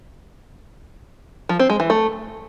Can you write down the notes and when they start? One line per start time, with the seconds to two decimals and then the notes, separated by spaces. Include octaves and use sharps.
1.49 F3
1.59 C4
1.70 G#3
1.80 E3
1.90 A3